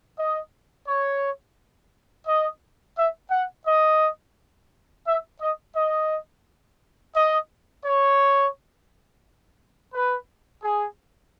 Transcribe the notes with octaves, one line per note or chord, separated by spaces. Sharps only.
D#5
C#5
D#5
E5
F#5
D#5
E5
D#5
D#5
D#5
C#5
B4
G#4